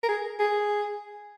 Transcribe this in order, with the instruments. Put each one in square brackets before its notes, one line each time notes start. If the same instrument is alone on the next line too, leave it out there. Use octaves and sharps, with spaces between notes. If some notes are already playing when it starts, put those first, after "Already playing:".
[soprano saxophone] A#4
G#4
G#4